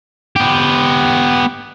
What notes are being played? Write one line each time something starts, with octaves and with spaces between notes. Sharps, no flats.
B3 G4